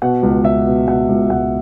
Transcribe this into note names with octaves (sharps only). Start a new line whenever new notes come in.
B2 F#5
C#2
C#2 E5
B2
B2 F#5
C#2
C#2 F#5